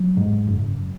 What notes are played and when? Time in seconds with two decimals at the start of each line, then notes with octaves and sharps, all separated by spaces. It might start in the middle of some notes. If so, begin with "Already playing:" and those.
Already playing: F#3
0.17 G#2
0.47 F#1